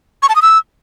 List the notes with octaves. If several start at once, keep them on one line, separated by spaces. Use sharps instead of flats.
C#6
A5
D#6
E6